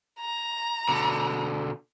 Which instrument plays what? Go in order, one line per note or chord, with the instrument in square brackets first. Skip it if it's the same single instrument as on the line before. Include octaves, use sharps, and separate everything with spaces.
[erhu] A#5
[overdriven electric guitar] B2 D3